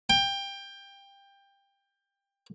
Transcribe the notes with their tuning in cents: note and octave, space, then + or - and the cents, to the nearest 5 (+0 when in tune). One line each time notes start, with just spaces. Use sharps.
G5 +20